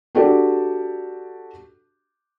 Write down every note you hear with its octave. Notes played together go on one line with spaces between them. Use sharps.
D4 F#4 G4 A4 D5